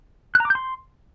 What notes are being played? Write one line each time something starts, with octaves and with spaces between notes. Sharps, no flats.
F#6
A#5
D6
G6
C6